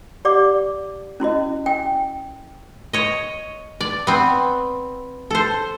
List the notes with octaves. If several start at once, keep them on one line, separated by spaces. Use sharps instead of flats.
G4 D5 F#5 D6
C#4 E4 F#4 D#5
G5 G#5
C#5 D#5
D5
B3 C4
A4 C5